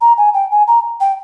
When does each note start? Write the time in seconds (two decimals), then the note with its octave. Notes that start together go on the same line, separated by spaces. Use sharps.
0.01 A#5
0.18 G#5
0.34 G5
0.51 G#5
0.67 A#5
1.00 G5